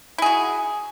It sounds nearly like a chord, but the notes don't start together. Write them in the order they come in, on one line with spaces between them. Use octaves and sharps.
E4 G#4 F#4